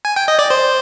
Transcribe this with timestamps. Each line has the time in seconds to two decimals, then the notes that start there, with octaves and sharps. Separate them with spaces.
0.05 G#5
0.16 G5
0.28 D#5
0.39 D5
0.50 C5